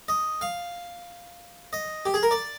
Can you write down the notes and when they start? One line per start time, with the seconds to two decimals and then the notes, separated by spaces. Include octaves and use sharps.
0.08 D#5
0.41 F5
1.73 D#5
2.05 G4
2.14 G#4
2.23 A#4
2.31 D5